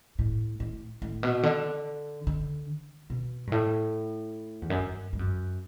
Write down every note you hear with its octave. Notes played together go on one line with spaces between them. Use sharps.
A2
A2
A2
B2
D3
D3
B2
G2
A2
E2
F#2
G2
G2
F#2